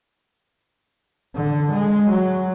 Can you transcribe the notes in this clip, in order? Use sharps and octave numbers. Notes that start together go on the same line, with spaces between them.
D3
G#3
F#3